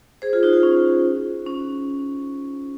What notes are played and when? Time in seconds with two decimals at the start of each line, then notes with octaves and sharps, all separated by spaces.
0.22 G#4 C5
0.33 F4 G#4
0.43 D#4 F#4
0.53 F4
0.63 C#4
1.46 C#4